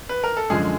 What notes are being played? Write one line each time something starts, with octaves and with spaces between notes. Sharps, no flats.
B4
A#4
A4
F#2 D3 F3 G#3 G#4